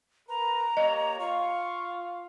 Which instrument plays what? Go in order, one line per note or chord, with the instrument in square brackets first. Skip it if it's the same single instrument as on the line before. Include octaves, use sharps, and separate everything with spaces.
[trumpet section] A#4 B4 [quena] A#5
[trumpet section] A#3 G4 C#5 [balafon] D#5
[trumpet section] F4 F5 [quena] C#6